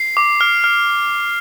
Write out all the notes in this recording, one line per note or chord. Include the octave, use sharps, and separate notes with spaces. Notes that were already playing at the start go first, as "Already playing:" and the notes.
Already playing: C7
D6
F6
F6